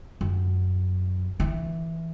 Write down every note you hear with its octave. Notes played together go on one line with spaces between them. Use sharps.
F#2
E3